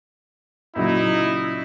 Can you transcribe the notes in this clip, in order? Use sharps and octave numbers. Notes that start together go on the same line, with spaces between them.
A#2 C#3 F#3 D#4 E4